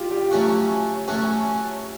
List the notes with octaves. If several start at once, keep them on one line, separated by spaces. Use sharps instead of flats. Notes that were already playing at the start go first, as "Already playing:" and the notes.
Already playing: F4 G4
G4
F#3 A3 C#4 F#4
F#3 A3 C#4 F#4